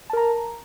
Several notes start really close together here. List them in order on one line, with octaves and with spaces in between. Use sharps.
A5 A#4 A#5